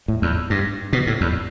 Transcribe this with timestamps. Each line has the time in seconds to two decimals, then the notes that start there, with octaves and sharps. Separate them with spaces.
0.08 A2
0.22 E2
0.50 G2
0.93 B2
1.07 A2
1.21 E2